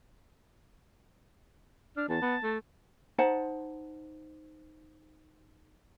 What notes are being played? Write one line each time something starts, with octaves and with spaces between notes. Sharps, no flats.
D4 F6
E2 A5
B3
A3
D#4 C5 F#5 A5